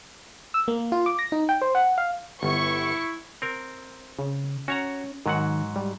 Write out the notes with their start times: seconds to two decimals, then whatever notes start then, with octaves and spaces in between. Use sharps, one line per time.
0.54 E6
0.68 A#3
0.92 F4
1.06 D6
1.19 A#6
1.32 D#4
1.49 G5
1.62 C5
1.75 F#5
1.98 F5
2.43 G1 E4 C#6
3.42 C4 A#4
4.19 C#3
4.68 C#4 F#4 C#5 A#5
5.26 G#2 D#3 F#3 F#5
5.76 G3